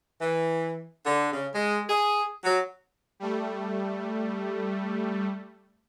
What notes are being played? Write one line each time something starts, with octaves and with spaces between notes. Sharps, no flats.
E3
D3
C#3
G#3
G#4
F#3
G3 A3